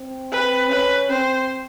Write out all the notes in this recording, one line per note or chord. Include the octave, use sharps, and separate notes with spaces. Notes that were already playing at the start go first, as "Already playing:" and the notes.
Already playing: C4
B4
C#4 B4
C4 C5